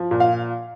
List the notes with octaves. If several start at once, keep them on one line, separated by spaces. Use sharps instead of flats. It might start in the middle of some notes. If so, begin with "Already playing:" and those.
Already playing: F3
A#2
F5